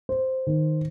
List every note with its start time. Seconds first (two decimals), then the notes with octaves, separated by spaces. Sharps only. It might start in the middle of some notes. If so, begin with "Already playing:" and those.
0.09 C5
0.47 D#3